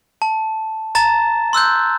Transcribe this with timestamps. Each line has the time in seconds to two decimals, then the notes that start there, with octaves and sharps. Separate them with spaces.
0.22 A5
0.95 A5 A#5 A6 E7
1.53 C6 E6 F#6 G6